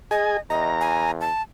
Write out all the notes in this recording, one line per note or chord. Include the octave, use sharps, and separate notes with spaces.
G#4 D#5 G#5
E2 D#5 A#5
G#5
A5